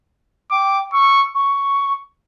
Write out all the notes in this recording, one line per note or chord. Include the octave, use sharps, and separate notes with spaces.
G5 D6
C#6 E6
C#6